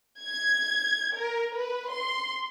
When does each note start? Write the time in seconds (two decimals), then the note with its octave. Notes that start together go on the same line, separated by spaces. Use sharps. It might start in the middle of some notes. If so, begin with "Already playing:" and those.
0.22 G#6
1.15 A#4
1.57 B4
1.91 C6